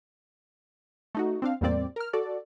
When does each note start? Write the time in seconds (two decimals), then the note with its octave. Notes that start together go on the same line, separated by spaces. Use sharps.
1.15 A3 D#4 F#4
1.42 C4 D4 F5
1.61 E2 A2 G3 A#3 C4 D5
1.96 A#4 F6
2.13 F#4 A4 D5